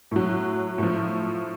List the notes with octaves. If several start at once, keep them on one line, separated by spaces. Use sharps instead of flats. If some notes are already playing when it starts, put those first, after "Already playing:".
A2 F#3
A2 F3